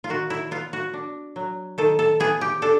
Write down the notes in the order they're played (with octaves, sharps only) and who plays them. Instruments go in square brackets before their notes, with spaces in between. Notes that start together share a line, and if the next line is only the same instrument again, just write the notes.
[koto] F4
D#3 F#4
E4
B3 F4
F#4
D4
F#3
D#3 A4
A4
B3 G#4
G4
D4 A4